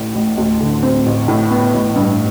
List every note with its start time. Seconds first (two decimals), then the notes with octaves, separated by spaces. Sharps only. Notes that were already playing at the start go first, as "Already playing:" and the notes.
Already playing: A1 A2
0.15 A1
0.38 D2
0.61 D3
0.83 C4
1.06 A1
1.28 A2
1.50 B3
1.74 A1
1.96 G2